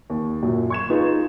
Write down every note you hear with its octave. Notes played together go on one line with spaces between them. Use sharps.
D#2
F#2 A#2
C#6 G#6 E7
D#4 F4 G#4 B4